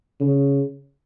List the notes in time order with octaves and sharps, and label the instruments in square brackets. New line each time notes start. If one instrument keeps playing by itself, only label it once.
[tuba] C#3